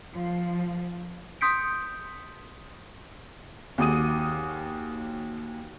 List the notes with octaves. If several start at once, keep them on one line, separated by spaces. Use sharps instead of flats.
F3
C6 D#6 G6 B6 C#7 D7
D#2 F#4 G#4 D6 D#6 D#7